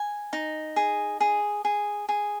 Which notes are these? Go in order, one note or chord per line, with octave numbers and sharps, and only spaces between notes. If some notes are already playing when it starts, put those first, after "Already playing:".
Already playing: G#5
D#4
G#4
G#4
G#4
G#4